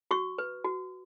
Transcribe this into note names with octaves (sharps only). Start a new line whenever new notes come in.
F#4 C#6
B4
F#4